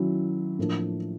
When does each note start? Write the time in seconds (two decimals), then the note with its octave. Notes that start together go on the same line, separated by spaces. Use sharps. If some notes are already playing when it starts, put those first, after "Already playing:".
Already playing: D#3 F#3 C#4 E4
0.58 A2 F3 A#3 D4